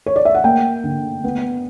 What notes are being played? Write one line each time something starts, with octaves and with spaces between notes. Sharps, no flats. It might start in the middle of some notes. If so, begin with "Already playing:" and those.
C#5
D5
E5
F#5
A#3 G5
D3
B3